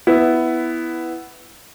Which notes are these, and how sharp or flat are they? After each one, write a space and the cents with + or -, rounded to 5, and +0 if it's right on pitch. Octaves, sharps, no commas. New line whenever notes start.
B3 +10 E4 +0